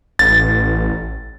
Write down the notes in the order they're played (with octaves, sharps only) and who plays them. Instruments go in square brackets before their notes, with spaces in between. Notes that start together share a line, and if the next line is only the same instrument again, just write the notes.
[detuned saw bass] A1 [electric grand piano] A6